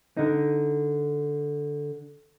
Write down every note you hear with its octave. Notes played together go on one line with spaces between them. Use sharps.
D3 D#4